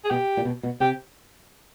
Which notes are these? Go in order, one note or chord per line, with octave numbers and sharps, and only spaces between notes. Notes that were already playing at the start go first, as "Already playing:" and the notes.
G#4
B2 G4
A#2
B2
B2
C3 G4